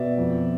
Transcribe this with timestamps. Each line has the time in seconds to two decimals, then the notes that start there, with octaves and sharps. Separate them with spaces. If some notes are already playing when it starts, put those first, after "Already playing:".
Already playing: B2 D5 E5
0.18 F2